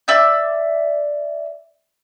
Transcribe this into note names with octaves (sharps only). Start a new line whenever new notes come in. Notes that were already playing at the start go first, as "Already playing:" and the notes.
D5 E5 E6 G6